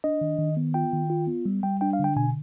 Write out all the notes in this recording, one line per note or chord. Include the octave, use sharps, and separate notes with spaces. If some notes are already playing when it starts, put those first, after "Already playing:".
D4 D#5
D#3
D#3
B3
F4 G5
D#3
F4
B3
G3
G3 G5
D4 G5
F5
D3 G5
B2 G#5